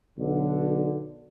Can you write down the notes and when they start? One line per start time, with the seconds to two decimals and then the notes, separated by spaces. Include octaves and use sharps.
0.18 B1 D3